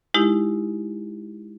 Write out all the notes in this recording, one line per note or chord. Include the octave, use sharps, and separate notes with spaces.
G#3 D#4 E4 G4